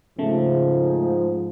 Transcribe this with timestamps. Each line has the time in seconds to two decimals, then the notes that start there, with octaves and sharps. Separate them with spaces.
0.19 G#2 C#3 F3 A3